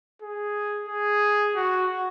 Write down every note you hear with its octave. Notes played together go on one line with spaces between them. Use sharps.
G#4
G#4
F#4